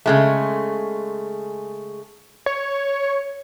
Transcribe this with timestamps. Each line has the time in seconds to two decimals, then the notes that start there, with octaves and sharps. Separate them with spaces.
0.06 C#3 G#3 A3
2.46 C#5